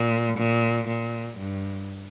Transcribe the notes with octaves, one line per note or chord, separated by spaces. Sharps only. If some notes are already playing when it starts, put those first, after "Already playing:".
Already playing: A#2
A#2
A#2
G2